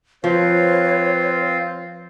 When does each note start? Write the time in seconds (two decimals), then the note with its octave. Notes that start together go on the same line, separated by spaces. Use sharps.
0.24 F3 C4 F4 B4 C#5 F5